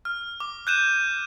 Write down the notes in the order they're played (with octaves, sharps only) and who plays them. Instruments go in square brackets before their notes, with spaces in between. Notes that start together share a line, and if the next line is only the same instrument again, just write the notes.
[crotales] F6
D6
F#6 G6 D#7 E7